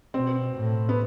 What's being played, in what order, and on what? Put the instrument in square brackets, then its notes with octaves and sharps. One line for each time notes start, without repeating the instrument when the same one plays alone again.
[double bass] B2 [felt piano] C4
[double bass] A2
[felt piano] B3